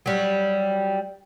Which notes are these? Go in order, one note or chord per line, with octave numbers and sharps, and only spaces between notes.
F#3 G3